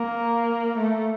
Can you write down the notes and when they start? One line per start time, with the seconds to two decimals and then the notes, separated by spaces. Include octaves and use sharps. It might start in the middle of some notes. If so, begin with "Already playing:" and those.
Already playing: A#3
0.78 A3